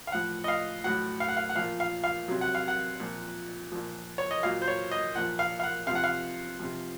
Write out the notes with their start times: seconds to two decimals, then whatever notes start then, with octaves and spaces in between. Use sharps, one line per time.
0.07 F5
0.12 A2 F3 F#5
0.44 D#5
0.48 F5
0.84 A2 F#3 F#5
1.20 F5
1.29 F#5
1.37 F5
1.49 F#5
1.56 A#2 F3 F5
1.80 F5
2.04 F5
2.28 C3 F#3
2.41 F#5
2.55 F5
2.68 F#5
3.00 A#2 F3
3.72 A#2 F3
4.18 C#5
4.31 D#5
4.43 A#2 F#3 F5
4.62 C5
4.68 C#5
4.91 D#5
5.15 A#2 F3 F#5
5.39 F5
5.60 F5
5.63 F#5
5.87 C3 F5
5.91 F3 F#5
6.04 F5
6.60 C3 F3